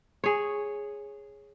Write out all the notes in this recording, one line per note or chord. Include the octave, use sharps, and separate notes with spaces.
G#4 C#5